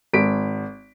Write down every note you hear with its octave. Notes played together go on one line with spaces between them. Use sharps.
G#1 B6 D7